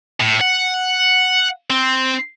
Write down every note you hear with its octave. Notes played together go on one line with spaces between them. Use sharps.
A2
F#5
C4